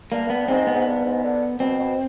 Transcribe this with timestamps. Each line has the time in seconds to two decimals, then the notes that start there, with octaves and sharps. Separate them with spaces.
0.12 G2 A#3
0.30 B3
0.48 G#2 C4
0.67 B3
0.75 G#2
0.86 G2
1.05 G#2
1.24 D3
1.60 B2 C4
1.79 B2